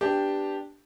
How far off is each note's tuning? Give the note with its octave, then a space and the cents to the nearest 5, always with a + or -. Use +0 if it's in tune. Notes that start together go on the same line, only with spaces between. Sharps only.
B3 +0 D4 -5 G4 +0